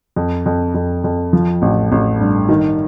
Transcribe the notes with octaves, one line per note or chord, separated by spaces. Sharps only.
F2
F2
F2
F2
F3
A1
A1
G2
D#3